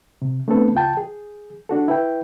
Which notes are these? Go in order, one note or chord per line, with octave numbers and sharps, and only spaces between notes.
C3
A3 B3 C4 D4 A4 B4
C#2 F4 G5 A5
G#4
D4 F#4 A4
E4 B4 G5